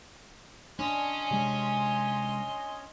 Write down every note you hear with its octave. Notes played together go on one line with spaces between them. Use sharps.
C#4 D4 D#5 C6
C3 G#3